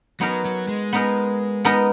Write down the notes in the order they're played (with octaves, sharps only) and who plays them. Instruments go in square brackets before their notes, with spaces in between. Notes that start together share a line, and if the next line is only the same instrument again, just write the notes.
[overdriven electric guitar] F#3 [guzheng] B3 D#4 A#4
[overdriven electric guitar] F#3
G#3
[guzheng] B3 D#4 A#4
B3 D#4 A#4